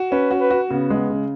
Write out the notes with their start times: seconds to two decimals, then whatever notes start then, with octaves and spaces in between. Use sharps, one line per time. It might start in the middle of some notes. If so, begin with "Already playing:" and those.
Already playing: F#4
0.12 C#4 B4
0.31 F#4
0.40 B4
0.50 F#4
0.70 C#3 B3
0.90 G#3
1.10 C#3